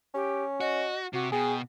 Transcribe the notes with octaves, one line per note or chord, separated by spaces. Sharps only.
C#4 G4
F#4 D#5
C3 F#4
B2 G#4 G5